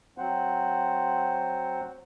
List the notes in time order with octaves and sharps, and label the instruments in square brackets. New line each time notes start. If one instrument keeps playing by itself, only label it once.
[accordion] F#3 C4 C5 F#5